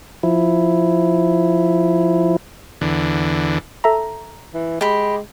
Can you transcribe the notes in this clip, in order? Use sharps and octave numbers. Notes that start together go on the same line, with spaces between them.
F3 E4
E2 D3
A4 E5 A#5
E3
G#3 G4 B5